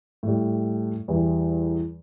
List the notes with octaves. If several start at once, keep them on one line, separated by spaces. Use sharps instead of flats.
A2 G3
E2 E3 G3